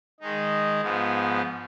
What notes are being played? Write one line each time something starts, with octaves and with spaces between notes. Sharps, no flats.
D#3 G#3 D#4
G#2 F3 B3